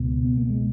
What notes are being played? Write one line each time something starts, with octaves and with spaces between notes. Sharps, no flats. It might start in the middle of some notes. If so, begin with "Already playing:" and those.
Already playing: C#2 B2
B3
A#3
G#3